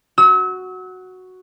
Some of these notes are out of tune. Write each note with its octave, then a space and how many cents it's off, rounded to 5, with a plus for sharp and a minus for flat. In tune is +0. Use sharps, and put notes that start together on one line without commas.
F#4 +0 E6 -40